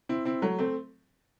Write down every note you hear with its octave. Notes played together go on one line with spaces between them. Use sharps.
C4 E4
C4 E4
F#3 A3
A3 C4